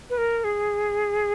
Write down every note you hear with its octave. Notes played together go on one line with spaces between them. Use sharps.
B4
A#4
G#4